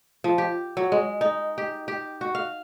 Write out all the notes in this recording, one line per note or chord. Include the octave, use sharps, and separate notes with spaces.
F3
G4
F#3
G#3
D#4
G4
G4
F#4
F5